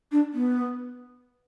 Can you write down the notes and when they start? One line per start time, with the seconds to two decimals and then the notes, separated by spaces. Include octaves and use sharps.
0.12 D4
0.34 B3